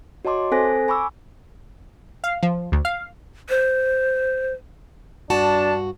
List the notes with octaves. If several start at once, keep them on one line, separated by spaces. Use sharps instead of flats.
F#4 C#5 D#5 A5 C6 D6
C4 A4 C5 G#5 F#6 A#6
G#5 B5 C#6 D6 E6
F5
F3
D2
F5
C5
G2 D4 F#4 A5